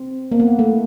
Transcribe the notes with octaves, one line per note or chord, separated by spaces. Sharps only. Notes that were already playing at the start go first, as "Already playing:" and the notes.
Already playing: C4
A#3
B3
A3